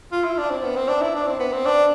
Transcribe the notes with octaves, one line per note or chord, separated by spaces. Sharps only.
F4
E4
D4
C4
B3
C4
D4
E4
D4
C4
B3
C4
D4